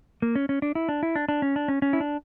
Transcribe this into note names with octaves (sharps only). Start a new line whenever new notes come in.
A#3
C#4
C#4
D4
E4
D4
E4
D4
D4
C#4
D4
C#4
C#4
E4
D4